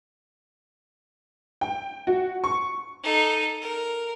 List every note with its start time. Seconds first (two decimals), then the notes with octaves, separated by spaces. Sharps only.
1.61 G5
2.07 F#4
2.44 C#6
3.03 D#4 A4
3.61 A#4